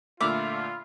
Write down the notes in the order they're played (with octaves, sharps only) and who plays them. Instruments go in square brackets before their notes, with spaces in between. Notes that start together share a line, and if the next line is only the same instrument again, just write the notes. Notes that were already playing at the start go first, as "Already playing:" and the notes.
[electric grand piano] A#2 D3 A3 [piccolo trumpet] F4 [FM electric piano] E5 B5 F6 [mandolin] D6